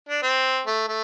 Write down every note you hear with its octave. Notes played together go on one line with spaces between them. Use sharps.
D4
C4
A3
A3